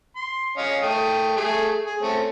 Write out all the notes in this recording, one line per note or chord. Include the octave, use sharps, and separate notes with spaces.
C6
C#4 D#5 F5
A3 G5 D#6
A3 G#4
G#4
A3 C4 C#4